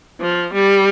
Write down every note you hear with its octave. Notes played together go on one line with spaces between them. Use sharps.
F3
G3